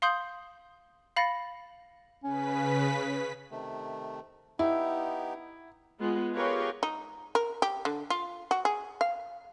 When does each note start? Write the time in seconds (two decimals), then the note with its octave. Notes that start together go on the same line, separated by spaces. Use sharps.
0.02 F5 C6 D#6 G6 F#7
1.17 F5 B5 A6 A#6 C#7
2.24 C#3 C#4 B4 B6
3.51 C3 D#3 A3
4.59 B3 D#4 E4 G4
6.00 G#3 B3 F4
6.33 F4 G4 G#4 A#4 B4 C#5
6.83 D#4
7.35 A#4
7.62 G4
7.85 D3
8.10 F4
8.51 F#4
8.65 G#4
9.01 F5